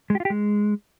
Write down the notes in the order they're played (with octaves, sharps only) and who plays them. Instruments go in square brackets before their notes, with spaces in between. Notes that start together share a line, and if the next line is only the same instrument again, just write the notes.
[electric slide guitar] G#3
G4
F4
G4
G#3